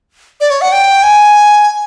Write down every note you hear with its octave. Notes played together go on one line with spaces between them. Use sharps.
D5
C#5
F#5
G5
G#5